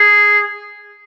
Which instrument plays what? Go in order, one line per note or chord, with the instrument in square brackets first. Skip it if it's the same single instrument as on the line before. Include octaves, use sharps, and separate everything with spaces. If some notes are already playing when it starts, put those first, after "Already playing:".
Already playing: [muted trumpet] G#4